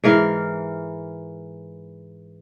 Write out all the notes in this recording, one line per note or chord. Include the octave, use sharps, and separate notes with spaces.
G#2 E3 A#4 F5